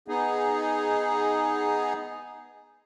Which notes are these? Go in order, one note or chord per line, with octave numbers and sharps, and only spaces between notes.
B3 D#4 G#4